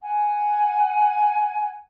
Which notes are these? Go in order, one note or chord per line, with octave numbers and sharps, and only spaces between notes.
F#5 G#5